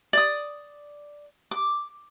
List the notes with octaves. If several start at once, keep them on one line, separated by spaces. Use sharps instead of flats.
D5 D#6
D6